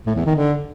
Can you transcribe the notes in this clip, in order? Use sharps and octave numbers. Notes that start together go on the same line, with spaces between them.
A2
E2
D#3
D3